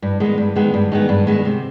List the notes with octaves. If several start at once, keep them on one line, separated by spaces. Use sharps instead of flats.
G2
D#3 G#3 B3
G2
D#3 G#3 B3
G2
D#3 G#3 B3
G2
D#3 G#3 B3
C3